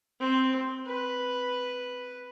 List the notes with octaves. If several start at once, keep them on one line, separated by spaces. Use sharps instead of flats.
C4
B4